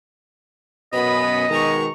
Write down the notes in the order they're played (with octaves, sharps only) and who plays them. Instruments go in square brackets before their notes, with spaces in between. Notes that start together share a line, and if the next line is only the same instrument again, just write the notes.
[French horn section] F#2 B2 B3 [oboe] D#5 [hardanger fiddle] B5
[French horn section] B2 D#3 G#3 [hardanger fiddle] A#5 C#6